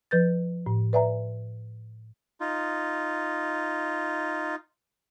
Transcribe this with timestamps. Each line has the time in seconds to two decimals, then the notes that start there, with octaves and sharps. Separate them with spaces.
0.11 F3 B4 G6 A6
0.66 A2
0.93 B4 D5 E5 G#5 A#5
2.41 D#4 F4